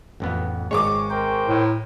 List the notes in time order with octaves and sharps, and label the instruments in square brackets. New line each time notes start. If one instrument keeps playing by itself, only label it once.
[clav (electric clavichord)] A1 F2 B3
[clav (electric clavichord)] G#1 C#5 [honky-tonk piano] G#3 C#6 D6
[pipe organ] A#4 C5 G5
[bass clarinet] A2